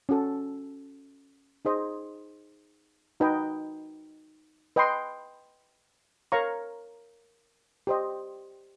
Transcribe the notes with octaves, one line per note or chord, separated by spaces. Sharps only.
C#4 F#4 A4
D#4 G#4 C5 D#5
D#4 F#4 B4 D#5 G5
B4 D#5 G5 C6
A#4 C#5 F5 A#5 C#6
G4 C5 D#5